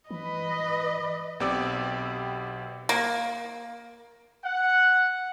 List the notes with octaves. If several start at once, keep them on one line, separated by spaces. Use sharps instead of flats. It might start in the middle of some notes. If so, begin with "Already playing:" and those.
E3 B4 D#5
B1 B3 C4 G4 D5 E6
A#3
F#5